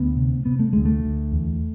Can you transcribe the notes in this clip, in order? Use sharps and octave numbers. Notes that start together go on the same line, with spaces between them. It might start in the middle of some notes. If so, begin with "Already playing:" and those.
Already playing: D2 B3
C3
C3 B3
A3
D2 G#3
A3
D2
E2